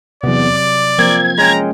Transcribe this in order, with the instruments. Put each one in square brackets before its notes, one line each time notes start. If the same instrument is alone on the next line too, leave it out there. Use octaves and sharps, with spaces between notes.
[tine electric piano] E2 B3 [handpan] C3 F#3 [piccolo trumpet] D5
[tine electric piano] D6
[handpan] F3 A#3 A#4 [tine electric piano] C4 [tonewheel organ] G#6
[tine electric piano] G#3 C#4 G5 [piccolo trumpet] A#5